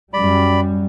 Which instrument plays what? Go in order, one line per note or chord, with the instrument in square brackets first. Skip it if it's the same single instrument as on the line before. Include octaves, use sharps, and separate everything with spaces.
[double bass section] F#2 G3 [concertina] D5 B5